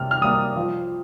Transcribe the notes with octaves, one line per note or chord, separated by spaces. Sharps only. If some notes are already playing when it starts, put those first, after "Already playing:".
Already playing: C3 G3 A#3 F6
F6
G3 A#3 D#6
F3